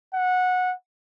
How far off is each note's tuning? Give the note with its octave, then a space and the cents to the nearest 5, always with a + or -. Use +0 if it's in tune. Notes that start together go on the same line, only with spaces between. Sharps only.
F#5 -15